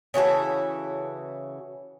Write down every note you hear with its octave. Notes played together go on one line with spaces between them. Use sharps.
C#3 E3 F#4 A4